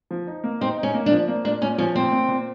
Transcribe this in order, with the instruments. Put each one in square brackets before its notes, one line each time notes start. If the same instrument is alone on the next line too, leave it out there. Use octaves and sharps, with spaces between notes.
[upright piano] F3
D#4
A#3
[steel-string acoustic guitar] C4 [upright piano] D#4
[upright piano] D#4
[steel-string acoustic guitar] C#4
[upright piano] A#3
[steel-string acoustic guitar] D4
[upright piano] F3
A#3
[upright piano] A#2 [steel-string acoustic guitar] D4
[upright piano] A#2 [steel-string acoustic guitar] C#4
[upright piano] F3 [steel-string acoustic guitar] C#4
[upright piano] A#2 [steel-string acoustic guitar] C4
[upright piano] A#2
A#2